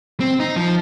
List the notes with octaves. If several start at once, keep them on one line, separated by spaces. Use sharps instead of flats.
C4
D#4
F3